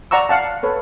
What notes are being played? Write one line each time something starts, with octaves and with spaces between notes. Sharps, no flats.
D5 F#5 A#5 C#6 E6
F5 F#5 A5
A4 B4 C#5